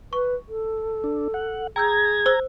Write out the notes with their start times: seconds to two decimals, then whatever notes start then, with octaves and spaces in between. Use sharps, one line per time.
0.13 B4 C#6
0.49 A4
1.04 D4
1.34 F#5
1.76 G#4 G5 A#5 E6 G6 G#6
2.26 C5 E6 G7